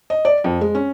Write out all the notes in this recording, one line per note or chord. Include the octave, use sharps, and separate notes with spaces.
D#5
D5
F2
G#3
C#4